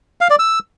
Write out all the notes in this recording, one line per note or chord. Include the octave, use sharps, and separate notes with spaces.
F5
D5
E6